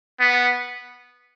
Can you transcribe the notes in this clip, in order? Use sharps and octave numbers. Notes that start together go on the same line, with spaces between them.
B3